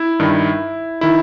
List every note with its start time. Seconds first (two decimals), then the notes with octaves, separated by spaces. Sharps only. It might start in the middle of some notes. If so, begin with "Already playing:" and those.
Already playing: E4
0.20 G2 D#3
1.01 D#3 E4